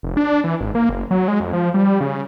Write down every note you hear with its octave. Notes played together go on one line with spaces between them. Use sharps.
F1
D4
E3
G#1
A#3
F#1
F#3
G#3
F2
F3
G3
C#3